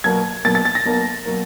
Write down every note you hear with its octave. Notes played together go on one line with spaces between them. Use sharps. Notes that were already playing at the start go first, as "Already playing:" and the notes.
B1 B2 F#3 A#3 G#6
B1 B2 F#3 A#3 A6
A6
A6
A#6
B1 B2 F#3 A#3
B2 F#3 A#3